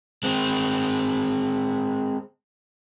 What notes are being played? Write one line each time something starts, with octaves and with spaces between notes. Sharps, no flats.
G#3 C4